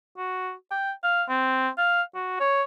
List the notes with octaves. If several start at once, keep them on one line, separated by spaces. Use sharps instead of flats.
F#4
G5
F5
C4
F5
F#4
C#5